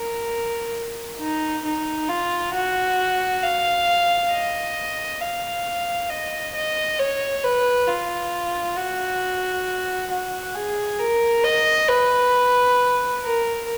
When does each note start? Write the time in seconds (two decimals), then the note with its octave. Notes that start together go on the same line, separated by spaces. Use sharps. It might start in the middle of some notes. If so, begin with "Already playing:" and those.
Already playing: A#4
1.19 D#4
1.65 D#4
2.09 F4
2.54 F#4
3.43 F5
4.31 D#5
5.21 F5
6.10 D#5
6.55 D#5
6.99 C#5
7.44 B4
7.87 F4
8.77 F#4
10.11 F#4
10.55 G#4
10.99 A#4
11.44 D#5
11.88 B4
13.22 A#4